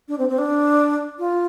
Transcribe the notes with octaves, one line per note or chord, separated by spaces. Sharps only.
D4
C4
C4
D4
F4